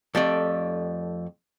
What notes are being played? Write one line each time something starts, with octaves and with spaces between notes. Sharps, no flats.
F2 A3 G4 D5